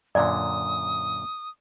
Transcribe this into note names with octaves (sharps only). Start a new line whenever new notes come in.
F#2 A#2 D3 D5 D#6